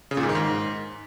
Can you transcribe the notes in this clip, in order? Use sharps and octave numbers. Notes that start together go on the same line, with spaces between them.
C#3
A#2
G#2
D#3
G#2